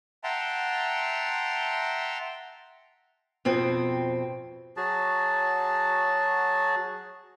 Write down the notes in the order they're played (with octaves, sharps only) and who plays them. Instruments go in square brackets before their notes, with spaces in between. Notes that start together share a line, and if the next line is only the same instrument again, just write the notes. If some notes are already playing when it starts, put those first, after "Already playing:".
[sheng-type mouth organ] E5 F#5 G5 A5 A#5 C6
[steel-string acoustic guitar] F2 B2 C4
[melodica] F#3 F#4 G#4 A5